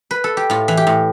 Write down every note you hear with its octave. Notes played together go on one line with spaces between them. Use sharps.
B4
A4
G4
A2 F4
E3
G4
A2